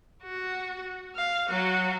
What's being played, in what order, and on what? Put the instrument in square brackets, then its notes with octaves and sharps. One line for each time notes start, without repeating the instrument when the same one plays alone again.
[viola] F#4
F5
F#3 F#4